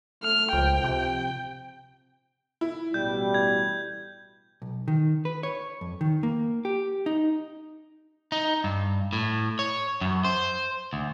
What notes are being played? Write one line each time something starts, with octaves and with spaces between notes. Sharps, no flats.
A3 F6
C#2 F3 G5
C3
E4
A1 B2 G3 G6
G#6
B1
D#3
B4
C#5
F2
D#3
A#3
G4
D#4
D#4
G2
A2
C#5
F#2
C5
D2